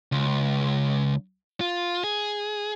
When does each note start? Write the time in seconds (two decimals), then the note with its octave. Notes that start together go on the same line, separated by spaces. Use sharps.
0.12 C#2
1.61 F4
2.04 G#4